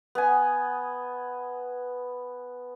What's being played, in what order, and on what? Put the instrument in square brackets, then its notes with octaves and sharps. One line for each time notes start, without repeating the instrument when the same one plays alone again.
[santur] B3 G#5